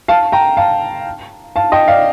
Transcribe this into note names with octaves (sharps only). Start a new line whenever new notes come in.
F5 A5
G5 A#5
F5 A5
F5 A5
D#5 G5
D5 F5